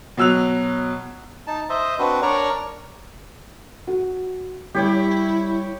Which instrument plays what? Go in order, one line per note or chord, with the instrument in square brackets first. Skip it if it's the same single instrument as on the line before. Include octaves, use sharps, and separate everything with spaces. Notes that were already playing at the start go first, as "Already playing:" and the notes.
[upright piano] B2 F#3 E6 F#6 F7
[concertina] D#4 A5
C5 D#5 E5
C4 D4 F#4 B4
D4 A#4 C#5 D5 A#5 C#6
[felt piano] F#4
[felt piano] G3 [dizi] E4 [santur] G4 C#5 G5